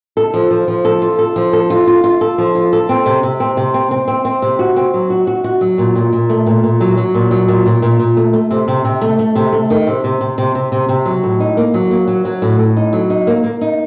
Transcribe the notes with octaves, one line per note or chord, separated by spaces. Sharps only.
A4
F3
F3
F3
A4
F4
A4
F3
A4
F4
F4
F4
A4
F3
F4
A4
C4
C3
C3
C4
C3
C4
C4
C4
C4
C3
F#4
C4
F#3
F#4
F#4
F#4
F#3
A#2
A#2
A#2
A3
A#2
A#2
F#3
F#3
A#2
F#3
A#2
A#2
A#2
A#2
A3
A3
C3
C3
C3
A3
A3
C3
A3
D#3
C3
C3
C3
C3
C3
C3
C3
F#3
A2
D#4
A#3
F#3
A#3
F#3
F#3
A2
A2
D#4
F#3
D#4
A#3
A#3
D#4